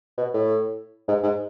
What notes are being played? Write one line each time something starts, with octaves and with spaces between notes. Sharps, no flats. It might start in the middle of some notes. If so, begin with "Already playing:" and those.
B2
A2
G#2
G#2